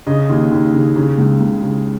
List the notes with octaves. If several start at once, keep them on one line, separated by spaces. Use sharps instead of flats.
C#3 D#5
D#2
D#2
C#3
C#3
C#2
C#2
C#3